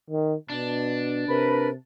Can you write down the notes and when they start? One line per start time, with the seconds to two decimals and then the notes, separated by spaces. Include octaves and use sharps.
0.10 D#3
0.50 B2 D4
1.28 C3 A#4 B4 B5